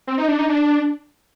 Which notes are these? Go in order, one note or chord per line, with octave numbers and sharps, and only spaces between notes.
C4
D#4
D4
D#4
D4